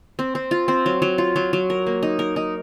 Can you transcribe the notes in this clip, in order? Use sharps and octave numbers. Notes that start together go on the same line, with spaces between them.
C4
C4
F4
C4
F#3
F#3
F4
F#3
F#3
A#4
A#3
D#4
A#4
D#4